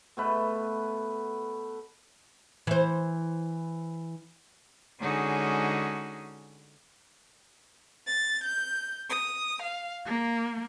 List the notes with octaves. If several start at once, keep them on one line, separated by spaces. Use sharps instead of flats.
B2 A3 B4
E3 C5
D3 G#3 C#4 D#4 F#4 G#4
A6
G6
D#6
F5
A#3